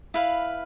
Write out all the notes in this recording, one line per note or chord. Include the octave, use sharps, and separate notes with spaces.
E4 B4 F5